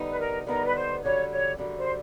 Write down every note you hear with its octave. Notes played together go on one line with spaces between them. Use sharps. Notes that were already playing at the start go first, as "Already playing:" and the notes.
Already playing: D3 G3 B3 D#4
B4
A#4
D3 G3 B3 D#4 A#4
B4
C5
F#2 D3 G3 C#5
C#5
F#2 D3 G3
C5